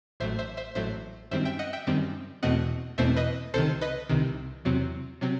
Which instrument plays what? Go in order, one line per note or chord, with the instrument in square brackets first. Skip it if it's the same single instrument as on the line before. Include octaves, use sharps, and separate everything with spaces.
[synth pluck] A1 A2 F#3 A3 C5 E5
C5 E5
C5 E5
A1 A2 F#3 A3 C5 E5
F#2 D#3 G3 C4 C5 E5
E5 G5
D#5 F#5
E5 G5
F#2 D#3 G3 C4
E2 B2 A3 C4 D#5 F#5
E2 B2 A3 C4 C5 E5
B4 D#5
C2 C3 D#3 A4 C5
B4 D#5
C2 C3 D#3
E2 C3 F#3 C4
C3 F#3 C4